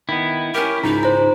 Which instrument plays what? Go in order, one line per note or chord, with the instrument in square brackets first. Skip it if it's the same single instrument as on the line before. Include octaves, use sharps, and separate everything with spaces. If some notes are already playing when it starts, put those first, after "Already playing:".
[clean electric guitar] D#3 B3 [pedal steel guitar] E4
[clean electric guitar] C#4 G4 [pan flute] A#4
[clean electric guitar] C#2 G#2 [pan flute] D#4 [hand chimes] A#5
[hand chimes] C5 A#5